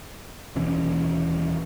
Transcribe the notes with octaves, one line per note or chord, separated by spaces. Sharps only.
D#1 B2 E3 C#4